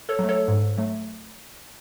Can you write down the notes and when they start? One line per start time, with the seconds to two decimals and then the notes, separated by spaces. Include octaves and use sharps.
0.09 A4 C#5
0.19 F#3 A3
0.29 A4 C#5
0.48 G#2
0.78 F#3 A3